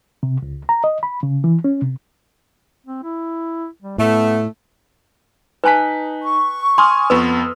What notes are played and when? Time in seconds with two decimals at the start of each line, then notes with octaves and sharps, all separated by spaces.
0.23 C3
0.42 C#2
0.69 A#5
0.84 D#5
1.03 B5
1.23 C#3
1.44 E3
1.64 C#4
1.82 C3
2.87 C4
3.03 E4
3.82 G3
3.98 A2 A3 B3
5.64 D#4 B4 G#5 A5 F#6 B6
6.24 C#6
6.78 G#5 C6 D#6 F6
7.10 F2 B3 B4 E6